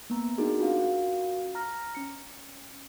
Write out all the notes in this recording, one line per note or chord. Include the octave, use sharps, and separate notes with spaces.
A#3 B3 A#5
D4 D#4 F#4 G#4 A#4
C#4 F4 F#4 A#4 F5
A#5 F6 A#6
C#4 C#7